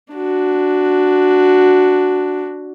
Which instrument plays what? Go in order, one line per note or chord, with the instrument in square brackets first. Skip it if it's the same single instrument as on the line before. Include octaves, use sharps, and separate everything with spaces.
[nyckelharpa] D4 F#4